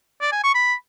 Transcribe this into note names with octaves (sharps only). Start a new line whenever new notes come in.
D5
G#5
C#6
B5